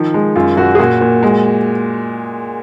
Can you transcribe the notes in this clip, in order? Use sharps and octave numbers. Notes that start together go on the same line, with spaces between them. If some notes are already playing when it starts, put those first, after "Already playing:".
Already playing: D#3 F3
G#3
F#2 F4
F#2 F#4
G#4
A#2 F#4
A#2
G#3